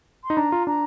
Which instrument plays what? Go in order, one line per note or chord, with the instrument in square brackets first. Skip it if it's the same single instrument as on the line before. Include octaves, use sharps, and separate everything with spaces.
[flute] C6
[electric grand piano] D#4
[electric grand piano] D4 [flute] A#5
[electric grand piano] F4
[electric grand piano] D4 [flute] A#5